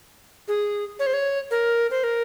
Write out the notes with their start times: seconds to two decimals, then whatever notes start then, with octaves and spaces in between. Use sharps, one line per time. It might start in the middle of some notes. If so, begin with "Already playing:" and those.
0.48 G#4
0.99 C#5
1.06 C5
1.14 C#5
1.51 A#4
1.91 C5
2.04 A#4